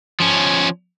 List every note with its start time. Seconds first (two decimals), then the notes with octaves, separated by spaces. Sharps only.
0.20 F3 C#4